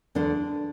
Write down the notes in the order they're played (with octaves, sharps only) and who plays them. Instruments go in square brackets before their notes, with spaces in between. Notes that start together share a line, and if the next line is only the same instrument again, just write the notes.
[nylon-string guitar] E2 D3 G#3 D4